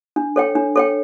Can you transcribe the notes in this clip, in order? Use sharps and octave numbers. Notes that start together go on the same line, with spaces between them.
D4
A4 C#5 G5
D4
A4 C#5 G5